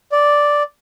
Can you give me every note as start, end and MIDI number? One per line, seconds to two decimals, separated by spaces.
0.12 0.63 74